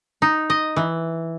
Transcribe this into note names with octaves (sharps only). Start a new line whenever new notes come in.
D#4
D#5
E3